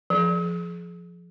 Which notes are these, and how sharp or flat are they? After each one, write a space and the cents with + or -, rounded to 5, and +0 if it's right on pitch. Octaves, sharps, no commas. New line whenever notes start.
F3 +0 G#4 +35